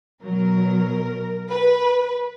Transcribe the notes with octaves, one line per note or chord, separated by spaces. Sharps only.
B2 F#3 A#4
B4